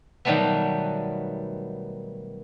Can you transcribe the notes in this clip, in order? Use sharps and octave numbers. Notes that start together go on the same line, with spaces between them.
B2 D#3 F#3 G3 A3 B3